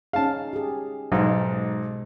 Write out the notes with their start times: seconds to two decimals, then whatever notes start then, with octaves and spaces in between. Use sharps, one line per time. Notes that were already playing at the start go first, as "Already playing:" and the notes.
0.13 C#4 D#4 G#4 F5 A5
0.53 G4 G#4
1.12 B1 G#2 B2 G#3 D#4